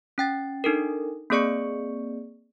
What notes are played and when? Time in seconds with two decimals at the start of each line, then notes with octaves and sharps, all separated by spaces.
0.18 C#4 G5 A6
0.64 D4 D#4 A4 A#4
1.30 A#3 C4 G#4 D5 C#6 C#7